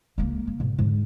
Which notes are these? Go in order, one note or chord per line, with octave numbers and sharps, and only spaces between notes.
C#2 A#3
A#3
G#2 B2
G#2 D3